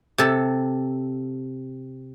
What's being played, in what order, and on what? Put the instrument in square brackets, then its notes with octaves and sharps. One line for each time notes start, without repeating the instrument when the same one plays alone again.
[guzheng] C3 A4